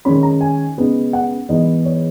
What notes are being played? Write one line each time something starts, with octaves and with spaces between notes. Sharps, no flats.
D#3 G#3 C#4 B5
A#5
G#5
C#3 G#3 B3 D#4
F#5
G#2 E3 B3 D#4 D#5
C#5